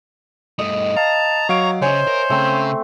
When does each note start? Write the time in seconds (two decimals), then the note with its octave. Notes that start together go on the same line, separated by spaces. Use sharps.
0.59 G2 A3 D#5
0.97 F5 A5 A#5
1.49 F#3 C#5 F5 D7
1.82 C#3 C5 C#5 E5 G#5
2.07 A#4
2.30 C#3 A3 C4